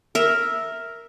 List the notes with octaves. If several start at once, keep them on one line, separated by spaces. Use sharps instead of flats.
A#4 E5